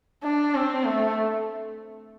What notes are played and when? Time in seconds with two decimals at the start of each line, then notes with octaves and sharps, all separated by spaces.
0.24 D4
0.55 C4
0.86 A3